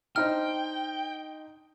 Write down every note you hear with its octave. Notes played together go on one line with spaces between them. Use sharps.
D4 D#4 C5 G5 F6